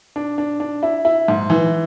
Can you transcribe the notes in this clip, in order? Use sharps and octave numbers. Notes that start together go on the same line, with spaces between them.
D4
D4
D4
E4
E4
G#2
E3